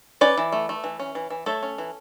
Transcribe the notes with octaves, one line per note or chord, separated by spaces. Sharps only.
C#4 B4 D5
E3
A3
A3
E3
C#4
E3
E3
A3 A4 C#5
C#4
E3